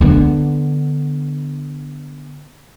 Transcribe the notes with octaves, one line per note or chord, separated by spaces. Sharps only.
D3 B3